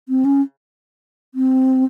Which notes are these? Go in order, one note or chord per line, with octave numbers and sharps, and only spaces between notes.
C4
C#4
C4